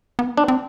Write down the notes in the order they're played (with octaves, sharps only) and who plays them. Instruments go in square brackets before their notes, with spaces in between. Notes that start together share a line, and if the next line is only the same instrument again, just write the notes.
[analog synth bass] B3
[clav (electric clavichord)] D4
[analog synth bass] C4